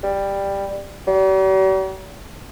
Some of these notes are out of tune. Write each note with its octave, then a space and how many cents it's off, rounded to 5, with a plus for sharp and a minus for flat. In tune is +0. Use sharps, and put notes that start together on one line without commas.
G3 +10
G3 -45